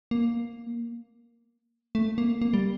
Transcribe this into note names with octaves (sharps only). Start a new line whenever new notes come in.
A#3
A3
A#3
A#3
G3